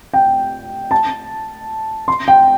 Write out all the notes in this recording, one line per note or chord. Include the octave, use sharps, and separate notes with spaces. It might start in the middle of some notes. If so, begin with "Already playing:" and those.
G5
A5
C6
G5